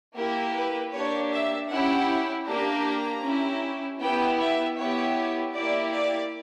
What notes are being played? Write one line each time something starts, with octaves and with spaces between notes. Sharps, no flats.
A#3 E4 G4 A#4
B4
A#3 D4 G4 C#5
E5
C#4 E4 G4 F#5
A#3 D4 G4 A#5
C#4 E4 G4
B3 E4 G4 G5
E5
B3 E4 G4 C#5
A#3 E4 G4 D5
D5